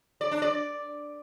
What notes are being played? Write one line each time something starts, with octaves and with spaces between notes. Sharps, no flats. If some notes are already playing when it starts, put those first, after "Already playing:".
D5
D4
D5